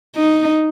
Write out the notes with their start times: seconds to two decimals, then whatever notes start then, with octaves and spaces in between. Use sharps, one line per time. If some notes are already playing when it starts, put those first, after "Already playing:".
0.16 D#4